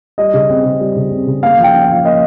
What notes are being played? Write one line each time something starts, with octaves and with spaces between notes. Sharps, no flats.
G3 D#5
C#3
C4
C#3
G3
C#3
C4
C#3
A#3 F5
F3
G5
C#4
F5
F3
A#3 D#5